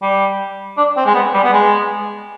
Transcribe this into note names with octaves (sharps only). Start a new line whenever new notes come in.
G3
D4
C4
G#3
B3
G3
B3
G#3